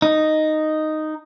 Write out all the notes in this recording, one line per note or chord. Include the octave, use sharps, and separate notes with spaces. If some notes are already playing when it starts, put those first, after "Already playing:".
D#4